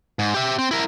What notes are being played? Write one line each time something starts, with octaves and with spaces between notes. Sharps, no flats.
G#2
G4 E5
C4
E4 A#4